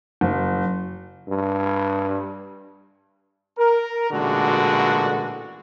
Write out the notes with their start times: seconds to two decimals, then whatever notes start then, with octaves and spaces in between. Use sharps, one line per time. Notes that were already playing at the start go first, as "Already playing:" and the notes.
0.21 F#1
1.29 G2
3.58 A#4
4.11 A1 A#2 D3 G#3 F#4